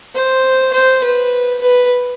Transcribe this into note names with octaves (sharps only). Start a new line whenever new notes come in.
C5
C5
B4
B4